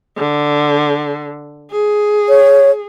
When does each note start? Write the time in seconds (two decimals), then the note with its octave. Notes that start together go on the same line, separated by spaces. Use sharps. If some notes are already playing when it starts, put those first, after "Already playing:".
0.18 D3
1.71 G#4
2.29 C#5